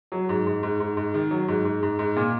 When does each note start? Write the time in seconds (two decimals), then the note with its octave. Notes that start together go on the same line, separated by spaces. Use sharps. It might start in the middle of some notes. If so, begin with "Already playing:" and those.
0.12 F#3
0.29 G#2
0.47 G#2
0.63 G#2
0.80 G#2
0.97 G#2
1.14 D#3
1.31 F#3
1.48 G#2
1.65 G#2
1.83 G#2
1.99 G#2
2.16 A#2